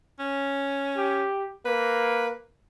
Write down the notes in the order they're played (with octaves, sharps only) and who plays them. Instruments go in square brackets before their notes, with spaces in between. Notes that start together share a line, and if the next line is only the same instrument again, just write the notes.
[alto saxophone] C#4
[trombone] G4
[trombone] A#3 [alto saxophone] B4